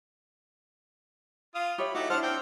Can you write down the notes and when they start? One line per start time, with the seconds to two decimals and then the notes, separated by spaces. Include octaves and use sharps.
1.55 F4 F5 D#6
1.78 G4 C#5 E5 B5
1.95 A3 D#4 E4 F#4 G4 D6
2.10 D4 E4 C5 F#5 A5 F6
2.22 C4 G5